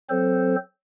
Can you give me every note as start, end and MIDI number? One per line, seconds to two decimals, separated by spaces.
0.10 0.56 54
0.10 0.56 60
0.10 0.56 69
0.10 0.56 72